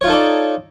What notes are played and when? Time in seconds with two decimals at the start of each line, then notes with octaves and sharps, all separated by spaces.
0.01 C#5
0.04 F4
0.07 D#4
0.10 A4
0.12 D5